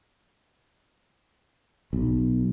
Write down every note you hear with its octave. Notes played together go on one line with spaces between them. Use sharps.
B1